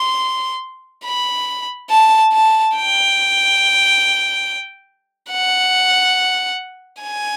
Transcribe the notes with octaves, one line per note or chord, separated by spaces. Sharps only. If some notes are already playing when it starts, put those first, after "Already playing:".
Already playing: C6
B5
A5
A5
G5
F#5
G#5